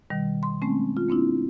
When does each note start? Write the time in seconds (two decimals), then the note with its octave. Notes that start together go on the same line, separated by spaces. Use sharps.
0.10 B2 D#3 G3
0.43 C6
0.62 G#3 A3 C4 C#4
0.97 F4
1.08 A#3 C4 D4 E4